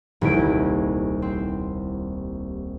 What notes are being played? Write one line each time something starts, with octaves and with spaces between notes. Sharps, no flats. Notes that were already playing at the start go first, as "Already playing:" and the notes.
D#1 C2 E4 D7
C4